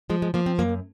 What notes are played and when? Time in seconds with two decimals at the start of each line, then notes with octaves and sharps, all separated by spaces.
0.10 F3 G#3
0.22 G#3
0.34 F3 A#3
0.46 C4
0.59 F#2 A#3